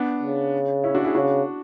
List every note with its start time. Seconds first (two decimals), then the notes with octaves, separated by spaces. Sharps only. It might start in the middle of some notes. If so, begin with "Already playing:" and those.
Already playing: B3 D4
0.23 C#3
0.84 C#4 E4
0.95 D4 F#4
1.04 E4 G#4
1.15 C#3 D4 F#4